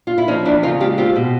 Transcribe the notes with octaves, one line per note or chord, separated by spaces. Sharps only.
F4
E4
F3 C#4 D#4
E2 D4 E4
C#3 D#4 F4
G#3 F4 G4
C4 F4 G4
B2